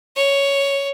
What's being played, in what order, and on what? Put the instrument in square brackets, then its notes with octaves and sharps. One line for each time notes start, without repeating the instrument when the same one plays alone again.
[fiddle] C#5